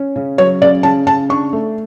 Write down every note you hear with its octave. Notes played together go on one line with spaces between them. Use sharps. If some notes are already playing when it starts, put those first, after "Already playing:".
Already playing: C#4
C#3
F#3 C#5
C#3 D5
C#3 A5
C#3 A5
D4 C#6
A3